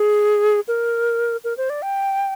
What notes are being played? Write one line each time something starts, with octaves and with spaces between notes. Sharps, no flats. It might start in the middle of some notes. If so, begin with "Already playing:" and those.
Already playing: G#4
A#4
A#4
C5
D5
G5